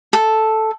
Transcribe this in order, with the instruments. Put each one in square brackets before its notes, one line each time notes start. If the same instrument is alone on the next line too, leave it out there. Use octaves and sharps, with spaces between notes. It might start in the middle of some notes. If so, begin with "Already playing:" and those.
[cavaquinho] A4